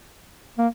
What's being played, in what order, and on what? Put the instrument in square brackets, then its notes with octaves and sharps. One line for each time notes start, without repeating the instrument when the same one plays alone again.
[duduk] A#3